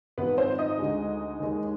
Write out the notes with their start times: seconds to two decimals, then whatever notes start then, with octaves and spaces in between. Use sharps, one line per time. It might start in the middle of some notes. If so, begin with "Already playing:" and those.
0.18 G#1 G#2 F3 B3 B4
0.38 C4 C5
0.59 D#4 D#5
0.79 D2 D3 G#3
1.40 D#2 D#3 G#3